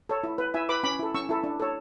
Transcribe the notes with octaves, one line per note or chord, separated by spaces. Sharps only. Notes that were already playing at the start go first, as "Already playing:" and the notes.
A4 C#5
E4
B4
E4 E5 G#5
B4 B5 D6
C#4 B5 D6
E4 A4
C#4 C#6 E6
E4 A4
D4
A4 C#5